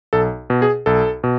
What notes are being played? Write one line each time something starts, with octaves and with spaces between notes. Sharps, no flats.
B1 A4
B2
G#4
B1 A4
B2